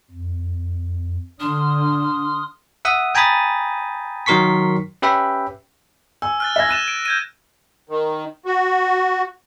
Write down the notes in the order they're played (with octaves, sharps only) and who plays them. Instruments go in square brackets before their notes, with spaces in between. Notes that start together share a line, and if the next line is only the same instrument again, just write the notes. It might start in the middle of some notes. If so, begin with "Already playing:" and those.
[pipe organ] F2
[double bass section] D3 [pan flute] D4 [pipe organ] C6 D#6 F6
[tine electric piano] E5 F#5 D#6
G5 G#5 A#5 B5 D#6 A6
D#3 F#3 A#4 C6 C#6 B6
C#4 G4 B4 E5 G5
[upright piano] G#5 [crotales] E6
[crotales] F6 F#6 A6
[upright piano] E5 G#5 G#6 [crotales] E6 A#6
[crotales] F#6 D#7 E7 [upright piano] A6
[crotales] D7
G6 G#6 D#7
[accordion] D#3
F#4